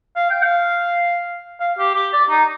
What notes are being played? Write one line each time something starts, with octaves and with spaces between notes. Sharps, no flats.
F5
G5
F5
F5
G4
G4
D5
D#4